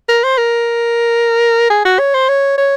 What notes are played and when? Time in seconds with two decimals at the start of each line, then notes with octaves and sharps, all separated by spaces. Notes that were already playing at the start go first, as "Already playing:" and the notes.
0.09 A#4
0.24 C5
0.38 A#4
1.70 G#4
1.85 F#4
1.99 C#5
2.14 C5
2.29 C#5
2.58 C#5